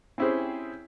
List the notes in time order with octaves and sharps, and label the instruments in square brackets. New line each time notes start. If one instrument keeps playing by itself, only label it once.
[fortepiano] C4 C#4 E4 G4 G#4 C5